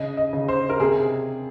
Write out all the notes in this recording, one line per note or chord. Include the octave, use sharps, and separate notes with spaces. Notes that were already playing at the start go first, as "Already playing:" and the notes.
Already playing: C#3 D#5
D#5
C#3
C5
A#4
C3 G#4